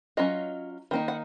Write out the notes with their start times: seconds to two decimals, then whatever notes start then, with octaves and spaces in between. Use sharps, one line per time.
0.17 F#3 C#4 F4 D#5
0.91 D#3 A#3 D#4
1.08 F#5